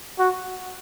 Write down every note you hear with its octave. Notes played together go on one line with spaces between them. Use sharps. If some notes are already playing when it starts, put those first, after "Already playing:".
F#4